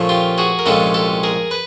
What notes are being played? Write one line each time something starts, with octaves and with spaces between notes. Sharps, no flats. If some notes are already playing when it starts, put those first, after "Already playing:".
Already playing: A#2 F3 A3 C#4
F4 G4
F#4 G#4
A#4
C2 A#2 F3 G#3 C#4 G4 A4
G4 A4
G#4 A#4
B4